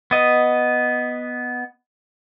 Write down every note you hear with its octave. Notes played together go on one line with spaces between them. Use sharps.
B3 D#5